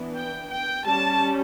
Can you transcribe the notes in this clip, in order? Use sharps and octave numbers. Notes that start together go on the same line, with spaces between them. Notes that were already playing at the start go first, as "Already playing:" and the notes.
Already playing: E3 B3 D4
G5
G5
G3 C#4 A5